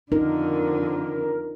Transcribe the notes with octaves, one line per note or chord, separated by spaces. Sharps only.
F2 D3 D#4 A#4